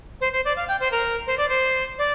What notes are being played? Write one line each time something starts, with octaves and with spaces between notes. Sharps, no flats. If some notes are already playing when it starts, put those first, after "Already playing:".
C5
C5
D5
F5
G5
C5
A#4
C5
D5
C5
D5